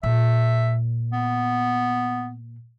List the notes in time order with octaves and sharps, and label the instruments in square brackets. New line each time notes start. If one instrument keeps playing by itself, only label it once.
[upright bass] A#2 [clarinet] E5
[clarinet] B3